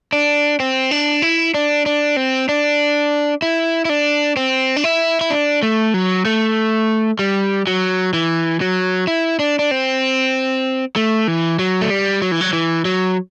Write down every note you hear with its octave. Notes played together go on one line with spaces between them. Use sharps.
D4
C4
D4
E4
D4
D4
C4
D4
E4
E4
D4
C4
D4
E4
E4
D4
A3
F#3
A3
G3
F#3
E3
F#3
E4
D4
D4
C4
A3
E3
F#3
A3
G3
F#3
E3
F#3
E3
F#3